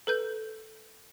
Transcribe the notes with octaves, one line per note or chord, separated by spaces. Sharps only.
A4 B4 G6